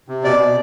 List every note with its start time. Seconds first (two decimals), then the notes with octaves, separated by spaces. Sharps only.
0.08 C3
0.24 B2 D5
0.39 B2